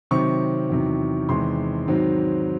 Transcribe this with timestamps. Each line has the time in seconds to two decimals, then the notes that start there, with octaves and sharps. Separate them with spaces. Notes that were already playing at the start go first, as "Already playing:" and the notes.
0.11 C3 D#3 F#3 C4 C#6
0.69 E2 C3 D#3 F#3
1.29 E2 C3 D#3 G#3 C6
1.88 G#2 D#3 F#3 C4